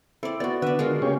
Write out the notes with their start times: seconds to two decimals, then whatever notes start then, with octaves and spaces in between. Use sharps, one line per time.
0.23 C4 E4 A4 D5
0.40 B3 F#4 D5
0.62 D3 B3 B4 D5 E5
0.79 G#3 F4 F#4 A#4
1.02 C#3 A#3 C#4 G4 C#5